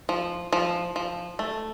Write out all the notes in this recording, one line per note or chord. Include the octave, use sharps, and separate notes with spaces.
F3
F3
F3
A3